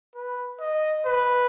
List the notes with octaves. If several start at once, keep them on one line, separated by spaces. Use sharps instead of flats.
B4
D#5
B4